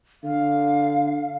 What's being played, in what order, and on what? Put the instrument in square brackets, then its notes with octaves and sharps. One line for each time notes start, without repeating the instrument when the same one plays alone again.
[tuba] D3 [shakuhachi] F5